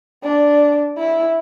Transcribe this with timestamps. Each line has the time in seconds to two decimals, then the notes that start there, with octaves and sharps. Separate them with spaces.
0.23 D4
0.98 E4